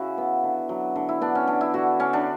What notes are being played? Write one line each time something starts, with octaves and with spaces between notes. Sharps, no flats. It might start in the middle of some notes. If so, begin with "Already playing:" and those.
Already playing: C#3 E4 F#4
B3
D3
F#3
D3
E4
B3 D4
C#4
D3 D4
E4
D3 F#4
D3 C#4
D4